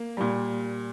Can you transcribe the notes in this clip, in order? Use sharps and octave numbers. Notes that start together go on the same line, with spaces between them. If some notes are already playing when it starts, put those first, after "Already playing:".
Already playing: A#3
A#2 G3